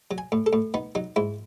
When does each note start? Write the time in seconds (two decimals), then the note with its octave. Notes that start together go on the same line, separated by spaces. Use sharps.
0.11 F#3
0.18 G#5
0.32 A2
0.46 A4
0.53 A2
0.74 B3 D#4
0.95 F#3 D#4
1.16 G#2 E4